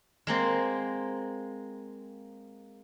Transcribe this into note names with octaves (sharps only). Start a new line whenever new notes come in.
G#3 A#3 C4